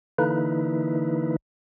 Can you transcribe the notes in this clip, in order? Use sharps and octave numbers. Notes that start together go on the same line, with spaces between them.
D3 E3 A#3 D#4 E4 B4